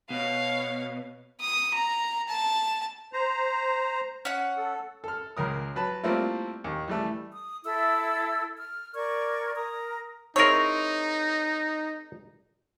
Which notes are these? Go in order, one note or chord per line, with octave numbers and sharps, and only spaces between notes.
B2 C#5 F5
D#6
A#5
A5
C5 A#5
C#4 F#5
A4
A4 F6
C#2 C#3 A#4 D#6
F#3 B4 A5 B5
G3 A3 A#3 C4 E4 F4
D#2
E3 G3 A3
D#6
E4 A4 E5 E6
F6
A#4 D5 C#6 G#6
A#4 A#5 D#6
C4 D#4 E4 G#4 A#4 C#5